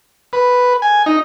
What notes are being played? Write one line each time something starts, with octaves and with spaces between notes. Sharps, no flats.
B4
G#5
D#4